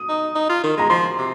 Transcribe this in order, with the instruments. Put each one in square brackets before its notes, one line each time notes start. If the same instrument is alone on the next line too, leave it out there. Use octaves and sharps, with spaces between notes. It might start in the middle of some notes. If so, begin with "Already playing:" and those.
Already playing: [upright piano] D#6
[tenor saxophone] D#4
D#4
F4
D#3
[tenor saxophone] G#3 [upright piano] A#5
[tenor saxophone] F3 [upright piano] C6
[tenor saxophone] C3